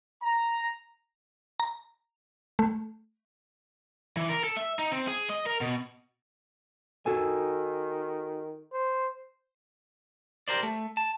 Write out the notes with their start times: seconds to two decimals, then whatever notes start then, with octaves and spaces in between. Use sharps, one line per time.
0.22 A#5
1.60 A#5
2.59 A3
4.17 E3
4.29 A#4
4.44 A4
4.57 E5
4.79 D#4
4.92 C4
5.08 G#4
5.29 D#5
5.46 A#4
5.61 B2
7.06 D#3 F#4 A4 G#5
8.72 C5
10.48 G4 A#4 C5 D5
10.63 A3
10.97 A5